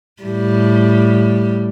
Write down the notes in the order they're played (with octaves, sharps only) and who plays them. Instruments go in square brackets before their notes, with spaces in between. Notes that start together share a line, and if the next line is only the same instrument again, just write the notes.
[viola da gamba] A2 G3